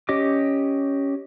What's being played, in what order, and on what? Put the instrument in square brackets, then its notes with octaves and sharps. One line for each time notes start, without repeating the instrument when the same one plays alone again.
[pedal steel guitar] C#4 G4 D#5 D6